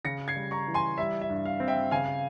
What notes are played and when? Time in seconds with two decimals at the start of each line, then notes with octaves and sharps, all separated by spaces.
0.05 C#3 A#6 C#7
0.28 G#6 C7
0.36 G3
0.51 A#5 C#6
0.68 E3
0.74 G#5 C6
0.98 G3 E5
1.22 E5
1.30 G2
1.45 F5
1.60 C4
1.68 E5 G5
1.91 C#3 F5 G#5
2.06 F5